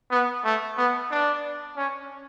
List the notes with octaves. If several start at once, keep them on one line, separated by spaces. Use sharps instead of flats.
B3
A3
B3
D4
C#4